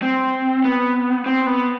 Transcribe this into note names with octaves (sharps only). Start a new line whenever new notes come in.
C4
B3
C4
B3